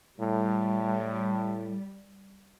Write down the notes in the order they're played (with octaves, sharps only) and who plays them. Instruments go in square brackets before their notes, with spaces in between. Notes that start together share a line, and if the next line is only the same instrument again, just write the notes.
[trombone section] A2 [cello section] G3